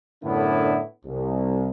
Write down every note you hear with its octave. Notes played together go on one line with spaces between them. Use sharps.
F#2 A2 D3 B3 D4 E4
C2